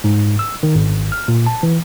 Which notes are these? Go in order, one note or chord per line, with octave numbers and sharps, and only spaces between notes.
G#2
E6
D#3
G#1
F6
A#2
A5
E3